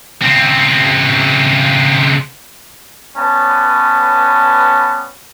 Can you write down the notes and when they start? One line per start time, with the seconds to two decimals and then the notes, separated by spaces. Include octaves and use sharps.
0.22 C#3 C4
3.17 G3 B3 C#4 B4 C#5 A5